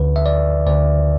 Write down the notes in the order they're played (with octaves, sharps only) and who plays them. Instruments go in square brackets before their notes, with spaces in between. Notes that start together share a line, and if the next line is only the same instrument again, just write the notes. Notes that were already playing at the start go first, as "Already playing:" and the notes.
Already playing: [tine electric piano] D2 D3 B4
E5
D5
D2 D3 D5